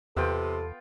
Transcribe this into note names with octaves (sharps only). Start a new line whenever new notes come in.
E2 C3 B3 F4 A4 G5